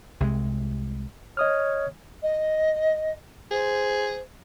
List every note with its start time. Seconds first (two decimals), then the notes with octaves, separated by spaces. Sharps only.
0.20 C2 C3 G#3
1.37 C#5 D#5 D#6 F6
2.22 D#5
3.51 G#4 C5